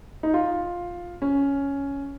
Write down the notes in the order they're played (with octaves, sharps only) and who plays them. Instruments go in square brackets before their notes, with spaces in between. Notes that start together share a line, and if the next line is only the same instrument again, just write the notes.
[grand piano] D#4
F4
C#4